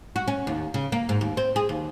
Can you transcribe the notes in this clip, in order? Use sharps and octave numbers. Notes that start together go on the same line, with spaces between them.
F#4
C#4
D#2
C#3
A#3
G#2
D#2
C4
G#4
D#2